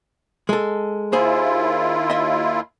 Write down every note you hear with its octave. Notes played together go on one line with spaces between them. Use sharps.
G#3 A4
D#2 E4 F4 G#4 C5
D#5 E5